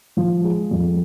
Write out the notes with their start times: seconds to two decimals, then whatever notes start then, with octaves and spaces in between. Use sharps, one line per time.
0.17 F3
0.44 G#3
0.71 F2